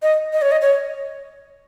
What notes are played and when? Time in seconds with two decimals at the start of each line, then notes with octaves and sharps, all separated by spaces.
0.02 D#5
0.33 D#5
0.42 C#5
0.51 D#5
0.61 C#5